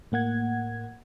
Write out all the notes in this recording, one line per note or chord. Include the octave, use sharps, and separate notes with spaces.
A2 A#3 F#5 G#6